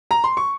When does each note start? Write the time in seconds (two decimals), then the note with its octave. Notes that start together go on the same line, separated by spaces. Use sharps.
0.11 A#5
0.24 C6
0.37 C#6